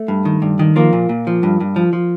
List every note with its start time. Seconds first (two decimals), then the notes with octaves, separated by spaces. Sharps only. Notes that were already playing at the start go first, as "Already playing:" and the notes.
Already playing: A3
0.08 G2
0.25 D#3
0.42 G2
0.59 D#3
0.76 F3 A#3
0.93 A#2
1.09 A#2
1.27 F3
1.43 G2
1.61 G2
1.76 F3
1.93 F3